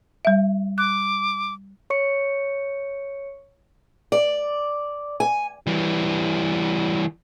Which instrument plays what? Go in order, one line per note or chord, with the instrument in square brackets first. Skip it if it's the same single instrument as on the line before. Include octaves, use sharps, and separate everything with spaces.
[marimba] G3 E5
[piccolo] D6 [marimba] F#6
[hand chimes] C#5 C#6 C#7
[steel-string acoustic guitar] D5
G#5
[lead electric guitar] E3 G3